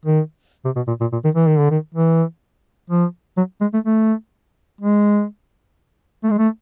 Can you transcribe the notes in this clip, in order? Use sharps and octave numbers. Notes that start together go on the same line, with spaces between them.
D#3
C3
B2
A#2
A#2
A#2
D#3
E3
D#3
D3
D#3
E3
F3
F#3
G#3
A3
A3
G#3
A3
G#3
A3